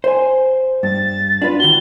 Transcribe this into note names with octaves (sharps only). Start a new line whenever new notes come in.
C5 G#5
G2 A6
D4 F4 B4
D#3 F#4 G7